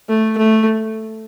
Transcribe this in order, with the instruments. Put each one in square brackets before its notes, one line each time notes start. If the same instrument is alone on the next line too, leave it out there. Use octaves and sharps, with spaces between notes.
[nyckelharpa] A3
A3